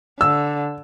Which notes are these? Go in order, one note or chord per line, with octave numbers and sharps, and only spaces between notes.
D3 E6